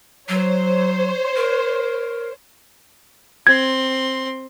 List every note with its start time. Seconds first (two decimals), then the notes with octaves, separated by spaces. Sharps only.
0.29 F#3 C5 C#5
1.36 A#4
3.47 C4 C6 G#6